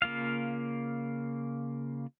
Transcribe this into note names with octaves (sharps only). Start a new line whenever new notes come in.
C#3 A#3 F4 F5